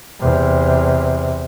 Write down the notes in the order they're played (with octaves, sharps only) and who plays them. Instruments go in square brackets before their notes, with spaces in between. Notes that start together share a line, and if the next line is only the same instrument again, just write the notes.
[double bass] E2 C3